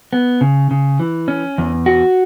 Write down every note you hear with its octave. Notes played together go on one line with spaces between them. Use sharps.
B3
C#3
C#3
E3
C#4
E2
F#4